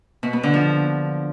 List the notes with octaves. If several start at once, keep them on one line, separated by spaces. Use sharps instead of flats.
B2
B3
D3
F3